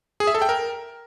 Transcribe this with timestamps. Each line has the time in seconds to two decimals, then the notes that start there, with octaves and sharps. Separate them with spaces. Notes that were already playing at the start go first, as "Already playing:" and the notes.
0.20 G#4
0.27 E5
0.35 A4
0.42 G5
0.49 A#4